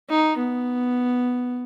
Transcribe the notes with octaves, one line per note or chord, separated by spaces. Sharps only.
D#4
B3